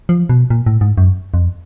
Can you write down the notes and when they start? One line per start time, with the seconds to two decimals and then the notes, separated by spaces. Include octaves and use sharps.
0.09 F3
0.29 B2
0.50 A#2
0.66 A2
0.81 G#2
0.98 F#2
1.34 F2